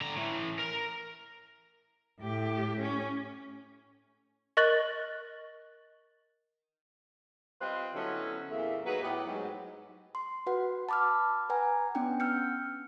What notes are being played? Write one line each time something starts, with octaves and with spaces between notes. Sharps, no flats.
D3 A#5
A2 E3
A#4
A2 G4
C#4
A#4 D#5 C#6 F#6 A6 F#7
G3 C4 F4 B4 C5 D#5
D3 F#3 B3 C#4 E4 A4
E2 A#2 A3 A#3 E5
F#3 D#4 F#4 G#4 B4
A2 B3 G4
G#2 F#3
C6
F#4 B4 F#5 C6
A5 B5 D6 E6 F6
B4 F#5 G#5 A#5
B3 C#4 D4 F#5 G5
E6 F6 G6 C#7